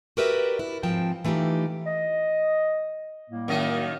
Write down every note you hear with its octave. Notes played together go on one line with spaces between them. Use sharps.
F#4 G4 A#4 B4 D5 E5
E4
G#2 F3 C4 G5 A5
E3 A3 D#4 F4 G4
D#5
A2 G3 A#3
F#2 D#3 D#5